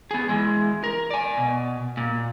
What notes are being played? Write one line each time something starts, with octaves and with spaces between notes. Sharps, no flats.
B3 G#4
E3 G#3
A#4
D5 G#5
B2
A#2